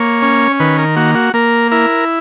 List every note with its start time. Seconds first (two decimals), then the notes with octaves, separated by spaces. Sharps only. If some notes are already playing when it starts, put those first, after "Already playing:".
Already playing: A#3 C#5
0.22 C#4
0.60 D#3 B4
0.78 A#4
0.96 A#3 F#4
1.15 F#4
1.34 A#3 A#4
1.71 E4 A#4